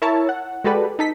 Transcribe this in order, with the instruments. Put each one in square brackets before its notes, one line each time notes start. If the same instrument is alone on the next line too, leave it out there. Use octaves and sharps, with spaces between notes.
[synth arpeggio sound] E4 A#4 C#5 E5 A5
F#5
G#3 F#4 G4 A4 B4 D5
D#4 A4 B6